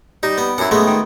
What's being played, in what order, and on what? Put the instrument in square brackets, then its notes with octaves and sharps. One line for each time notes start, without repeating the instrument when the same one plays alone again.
[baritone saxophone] G3 [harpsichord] D#4
[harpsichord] B3
[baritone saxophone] F#2 [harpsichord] E4 F#5
[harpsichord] G#3 A3 B3
[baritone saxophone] D#3